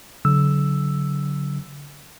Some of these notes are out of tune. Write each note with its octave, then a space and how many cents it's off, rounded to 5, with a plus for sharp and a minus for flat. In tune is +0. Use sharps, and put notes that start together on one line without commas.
D3 -40 F#3 +0 E6 +0